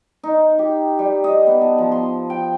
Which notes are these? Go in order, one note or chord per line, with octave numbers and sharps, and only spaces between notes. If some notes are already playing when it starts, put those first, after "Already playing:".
D#4
G4
G3
D#5
B3
A5
F3
C6
G5